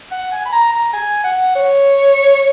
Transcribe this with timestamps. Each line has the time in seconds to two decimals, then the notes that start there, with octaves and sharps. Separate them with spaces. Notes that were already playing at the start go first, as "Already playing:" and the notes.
0.11 F#5
0.32 G#5
0.45 B5
0.52 A#5
0.72 A#5
0.93 G#5
1.24 F#5
1.55 C#5